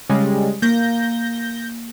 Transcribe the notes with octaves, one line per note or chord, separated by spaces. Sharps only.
C#3 G3 G#3
A#3 G6 A#6